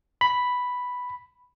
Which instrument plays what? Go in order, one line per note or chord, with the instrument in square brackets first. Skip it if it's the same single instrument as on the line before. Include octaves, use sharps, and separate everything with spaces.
[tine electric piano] B5